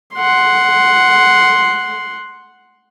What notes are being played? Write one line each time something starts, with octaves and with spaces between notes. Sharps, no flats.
F#5 C6